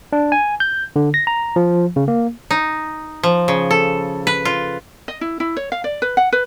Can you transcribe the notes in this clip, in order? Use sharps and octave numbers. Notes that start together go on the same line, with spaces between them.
D4
G#5
G6
D3
A#6
A#5
F3
C#3
A#3
D#4
F3
C#3
A4
B4
F4
D#5
E4
E4
C#5
F5
D5
B4
F#5
B4